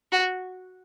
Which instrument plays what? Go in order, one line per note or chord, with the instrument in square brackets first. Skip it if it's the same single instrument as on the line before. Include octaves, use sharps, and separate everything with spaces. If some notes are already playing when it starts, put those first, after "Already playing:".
[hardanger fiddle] F#4